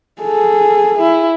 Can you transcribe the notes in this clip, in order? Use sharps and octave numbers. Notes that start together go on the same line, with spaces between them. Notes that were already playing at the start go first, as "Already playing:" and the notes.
G#4 A4
E4